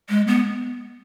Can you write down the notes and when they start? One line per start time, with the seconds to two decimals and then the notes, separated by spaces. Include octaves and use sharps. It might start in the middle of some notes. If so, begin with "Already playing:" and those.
0.09 G#3
0.28 B3